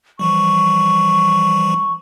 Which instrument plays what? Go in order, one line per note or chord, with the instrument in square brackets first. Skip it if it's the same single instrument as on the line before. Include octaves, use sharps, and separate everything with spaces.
[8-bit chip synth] E3 F3 G3 [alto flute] C#6